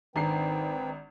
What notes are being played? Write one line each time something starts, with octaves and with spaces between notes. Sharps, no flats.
G#1 D#3 C4 D4 B4 G5 A#5 C7